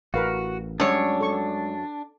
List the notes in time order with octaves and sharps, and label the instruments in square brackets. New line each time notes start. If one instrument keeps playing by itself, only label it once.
[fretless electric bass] A1 [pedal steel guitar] F#4 [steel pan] A#4 B4 F5
[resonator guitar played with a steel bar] F#2 C#5 [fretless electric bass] G3 G#3 C#4 [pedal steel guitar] D4
[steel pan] A4 C#6